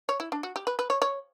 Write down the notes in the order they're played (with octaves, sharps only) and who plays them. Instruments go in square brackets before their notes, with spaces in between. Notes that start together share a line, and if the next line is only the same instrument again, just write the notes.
[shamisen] C#5
E4
D4
F#4
G4
B4
B4
C#5
C#5